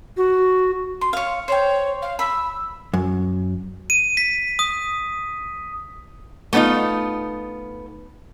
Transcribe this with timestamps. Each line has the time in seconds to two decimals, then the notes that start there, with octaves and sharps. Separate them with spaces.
0.17 F#4
1.01 C6
1.13 C#5 F5
1.48 C5 C#5 G5
2.02 F5
2.19 B5 E6
2.94 F#2
3.90 D#7
4.17 B6
4.59 D#6
6.53 A3 B3 C4 D#4 F4